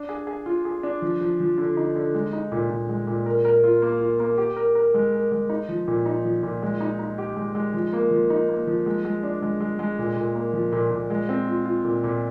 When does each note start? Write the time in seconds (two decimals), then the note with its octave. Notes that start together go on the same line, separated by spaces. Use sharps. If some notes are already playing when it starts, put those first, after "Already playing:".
Already playing: D4
0.09 G#4
0.27 G#4
0.46 F4
0.65 G#4
0.83 D4
1.02 F3
1.21 F3
1.40 F3
1.58 D3
1.77 D#4
1.96 D3
2.15 G#3
2.33 D#4
2.52 A#2
2.70 A#2
2.89 G#3
3.07 A#2
3.26 A#4
3.45 A#4
3.64 F4
3.82 A#3
4.01 F4
4.20 A#3
4.38 G4
4.56 A#4
4.75 A#4
4.94 G#3
5.12 A#4
5.32 G#3
5.49 D#4
5.69 F3
5.88 A#2
6.06 D#4
6.25 F3
6.43 A#2
6.62 G#3
6.80 D#4
6.99 D#4
7.18 G4
7.37 G#3
7.55 G#3
7.73 F3
7.93 A#3
8.11 F3
8.30 D#4
8.49 A#3
8.67 F3
8.86 G#3
9.05 G#3
9.23 D4
9.42 G#3
9.61 G#3
9.79 G#3
9.99 A#2
10.16 A#2
10.35 A#3
10.53 F3
10.72 A#2
10.91 A#2
11.10 G#3
11.29 C4
11.48 F4
11.65 F4
11.84 A#2
12.04 A#2